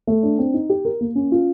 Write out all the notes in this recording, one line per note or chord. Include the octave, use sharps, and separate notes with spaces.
A3
D4
C4
D#4
G4
A#4
A#3
C#4
F4